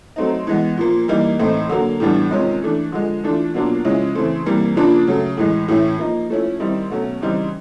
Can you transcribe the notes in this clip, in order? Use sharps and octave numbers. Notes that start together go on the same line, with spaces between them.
F#3 A3 C4 D#4
E3 G#3 B3
A#2 F3 A#3
E3 G3 A#3 D#4
A2 E3 A3 C4 D#4
D3 F#3 A#3
A2 E3 G3 B3 D4
C3 D#3 G#3 C#4 F4
E3 A3 D4
D3 F3 G#3
E3 A3 D4 F4
B2 F#3 A#3 D4 F4
C#3 F3 G#3 C#4 E4
C#3 E3 A3 C4
C3 E3 G3 A#3
C#3 F3 A#3 D4 F4
C#3 F#3 A3
A2 E3 G#3
A2 E3 A3 C#4 E4
F3 A#3 D#4
F3 A3 C#4 E4
D#3 G3 C4 E4
B2 F#3 A3 C#4
C#3 E3 G3 C4 D#4